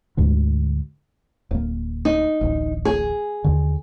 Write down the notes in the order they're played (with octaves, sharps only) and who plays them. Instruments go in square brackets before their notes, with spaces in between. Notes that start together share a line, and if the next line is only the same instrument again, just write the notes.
[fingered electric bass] D2 G#2 D3
D1 A#3
[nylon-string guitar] D#4
[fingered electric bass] D1 A1
[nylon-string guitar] G#4
[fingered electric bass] D#2 D3